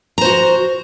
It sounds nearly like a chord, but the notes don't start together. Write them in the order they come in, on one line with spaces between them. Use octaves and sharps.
A#5 C5 F#4